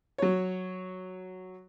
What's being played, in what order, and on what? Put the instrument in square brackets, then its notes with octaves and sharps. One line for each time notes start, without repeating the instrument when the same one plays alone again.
[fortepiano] F#3 C#5